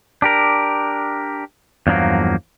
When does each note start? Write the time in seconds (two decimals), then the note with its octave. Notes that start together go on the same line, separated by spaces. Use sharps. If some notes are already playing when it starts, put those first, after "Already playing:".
0.22 D4 G4 A#4
1.87 E2 G2 F3 F#3 A#3